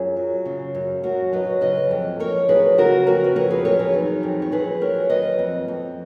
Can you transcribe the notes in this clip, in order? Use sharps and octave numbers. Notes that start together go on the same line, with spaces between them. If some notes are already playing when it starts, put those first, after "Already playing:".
Already playing: F#2 F4 G#4
F#3
C#3
F#2
F#2 F#4 A#4
F#3 B4 D#5
C#3 B4 D#5
F2
F2 A#4 C#5
F#3 G#4 B4
C#3 F#4 A#4
F2 F#4 A#4
B4
F2 A#4 C#5
G#4 B4
F#3 A#4 C#5
G#4 B4
D#3
F2
C#5
F2 G#4 B4
F#3 A#4 C#5
D#3 B4 D#5
F2
F2